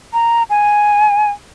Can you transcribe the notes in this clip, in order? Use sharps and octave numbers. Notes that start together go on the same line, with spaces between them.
A#5
G#5